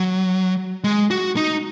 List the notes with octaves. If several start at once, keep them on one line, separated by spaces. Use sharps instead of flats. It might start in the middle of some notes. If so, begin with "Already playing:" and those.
Already playing: F#3
G#3
F#4
D#4